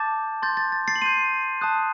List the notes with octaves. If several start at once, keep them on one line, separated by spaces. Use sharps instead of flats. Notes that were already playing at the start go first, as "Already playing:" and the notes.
Already playing: A5 D6 G6 A6
C6 G6 A6
A6
A6
A6 C7
F#7
C6 G6 C7 D#7
A5 D#6 F#6